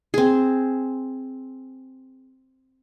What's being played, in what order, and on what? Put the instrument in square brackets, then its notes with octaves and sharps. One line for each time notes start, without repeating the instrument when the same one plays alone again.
[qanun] C4 G#4